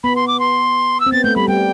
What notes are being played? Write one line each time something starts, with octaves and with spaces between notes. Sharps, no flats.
B3 B5
C6
D6
C6
E6
C4
B3 A6
A3 G6
G3 B5
G3 G5